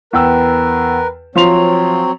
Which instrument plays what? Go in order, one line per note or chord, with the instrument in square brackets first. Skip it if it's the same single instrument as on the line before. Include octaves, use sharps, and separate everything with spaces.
[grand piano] E2 G5 E6 [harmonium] A#4 B4
[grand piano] F3 C6 F7 [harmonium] F#3 C4 C#5